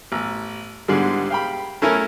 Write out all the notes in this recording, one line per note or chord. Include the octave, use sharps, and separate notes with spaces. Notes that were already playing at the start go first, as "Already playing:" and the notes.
A1
G#2 D3 G3 G#3
F5 G5 B5
A3 C#4 E4 A#4 G#5